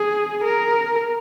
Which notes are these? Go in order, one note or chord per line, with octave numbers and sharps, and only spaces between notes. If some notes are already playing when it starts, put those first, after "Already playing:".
Already playing: G#4
A#4